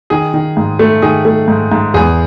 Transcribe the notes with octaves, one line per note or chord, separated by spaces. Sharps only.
D#3 G#4
D#3
G#2
A3
D#3 G#4
A3
G#2
G#2
E2 G#4